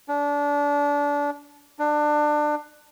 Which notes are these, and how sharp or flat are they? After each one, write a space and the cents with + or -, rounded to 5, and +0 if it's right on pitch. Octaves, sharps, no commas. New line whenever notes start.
D4 -25
D4 +25